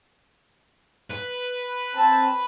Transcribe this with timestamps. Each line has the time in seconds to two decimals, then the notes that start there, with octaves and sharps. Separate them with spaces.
1.10 B4
1.95 C4 A5